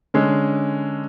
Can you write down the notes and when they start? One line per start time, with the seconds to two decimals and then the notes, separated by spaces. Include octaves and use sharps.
0.14 D3 G#3 C#4